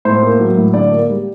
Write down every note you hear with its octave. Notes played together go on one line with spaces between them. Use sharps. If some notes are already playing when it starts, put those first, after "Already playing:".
A2 C5
A#3
F#3
A2
D3 D5
A#3
G3